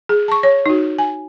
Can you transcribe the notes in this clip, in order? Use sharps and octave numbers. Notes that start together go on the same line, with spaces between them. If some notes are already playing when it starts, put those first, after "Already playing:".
G#4
A5 C#6
C#5
D#4 F#4
G#5